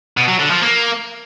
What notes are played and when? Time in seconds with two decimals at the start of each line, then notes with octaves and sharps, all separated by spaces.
0.17 B2
0.28 F#3
0.39 D3
0.50 F3
0.61 A#3